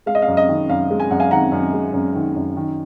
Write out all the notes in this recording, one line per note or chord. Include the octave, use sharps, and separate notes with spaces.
G#3 F5
D#5
F5
F#2
D#5
D#3
F#2 F5
G#3
G#5
F#2 F#5
F5 G#5
D#3 F#5 A#5
F#2
G#3
F#2
D#3
F#2
D#3